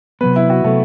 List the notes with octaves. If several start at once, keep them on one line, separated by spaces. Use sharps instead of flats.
C3 F#3 B3 B4
E4
F#4
C3 F#3 A3 B3